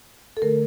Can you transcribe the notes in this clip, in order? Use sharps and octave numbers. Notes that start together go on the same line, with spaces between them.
A4
D3 A3 A#4